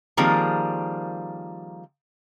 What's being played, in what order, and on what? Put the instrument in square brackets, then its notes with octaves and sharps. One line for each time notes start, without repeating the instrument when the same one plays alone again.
[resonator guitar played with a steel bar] D#3 F3 G3 A#3 C4 G#4